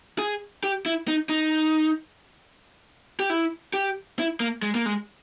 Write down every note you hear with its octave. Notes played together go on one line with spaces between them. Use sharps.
G#4
G4
E4
D#4
D#4
G4
E4
G4
E4
A#3
G#3
A#3
G#3